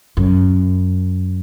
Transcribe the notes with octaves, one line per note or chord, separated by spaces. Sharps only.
F#2